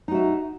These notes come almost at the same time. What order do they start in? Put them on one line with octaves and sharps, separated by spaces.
D#4 F#4 E5